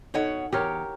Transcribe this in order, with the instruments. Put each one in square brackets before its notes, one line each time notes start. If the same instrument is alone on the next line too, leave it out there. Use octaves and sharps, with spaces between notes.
[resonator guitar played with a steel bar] B2 C#5 F#5 [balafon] D#4 A4 D#5
[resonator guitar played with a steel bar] E2 [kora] G4 A#4 C#5